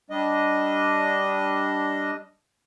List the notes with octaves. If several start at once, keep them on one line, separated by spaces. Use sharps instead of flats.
G3 D4 D#5